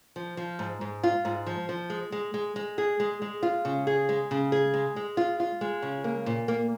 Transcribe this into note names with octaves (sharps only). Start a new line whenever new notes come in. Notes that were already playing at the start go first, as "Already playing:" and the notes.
F3
F3
G#2
G#2
F4
G#2
F3
F3
G#3
G#3
G#3
G#3
G#4
G#3
G#3
F4
C#3
G#4
G#3
C#3
G#4
G#3
G#3
F4
F4
G#3
C#3
A#3
A#2
A#3